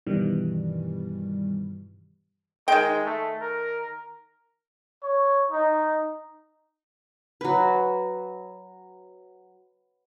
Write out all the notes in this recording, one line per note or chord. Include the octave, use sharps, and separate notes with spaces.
G2 B2 D#3 E3 G3
D#3 G#3 G5
A3
A#4
C#5
D#4
F#3 B4